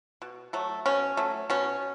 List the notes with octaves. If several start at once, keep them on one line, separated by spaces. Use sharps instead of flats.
B2
F#3 A3
B2 C#4
F#3 A3
B2 C#4